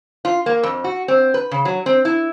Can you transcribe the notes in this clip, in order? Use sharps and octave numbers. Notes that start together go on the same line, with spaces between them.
F4
A#3
F2
F#4
C4
B4
C#3
F#3
C4
E4